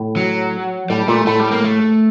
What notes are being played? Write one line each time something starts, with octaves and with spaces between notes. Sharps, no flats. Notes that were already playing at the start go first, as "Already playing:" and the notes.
Already playing: A2
F#3
A2 G3
A#2 A3
A2 A3
G3
A#3
A3